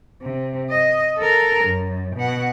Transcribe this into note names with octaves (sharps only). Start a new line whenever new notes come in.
C3
D#5
A4 A#4
F#2
B2 F#5